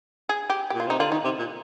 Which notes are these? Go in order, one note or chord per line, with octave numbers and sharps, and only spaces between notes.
G#4
G4
G4
A#2
F4
C3 D#4
D3 F4
D#3 D#4
C3
A#2